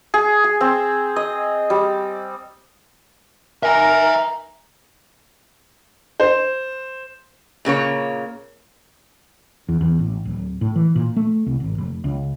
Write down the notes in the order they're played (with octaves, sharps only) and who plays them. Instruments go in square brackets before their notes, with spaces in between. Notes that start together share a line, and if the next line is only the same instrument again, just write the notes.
[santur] G#4
G#4
C4
D#5
G3
[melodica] D#4 [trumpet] A#4 [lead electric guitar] E5 G#5 [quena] A#5
[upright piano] C5
[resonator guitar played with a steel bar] A#2 C#3 A#3 C#5
[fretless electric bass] E2
E2
A1
D1
A2
E3
A#2
A3
C2
G#1
F1
C#2